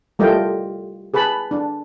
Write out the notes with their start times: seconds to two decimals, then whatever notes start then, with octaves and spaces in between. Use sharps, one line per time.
0.19 G3 A3 F4 A#4 D#5 G5
1.14 G#4 B4 A5 B5
1.51 D4